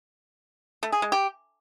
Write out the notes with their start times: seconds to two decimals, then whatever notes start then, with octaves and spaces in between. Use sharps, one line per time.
0.83 A3
0.92 G#4
1.02 G#3
1.12 G4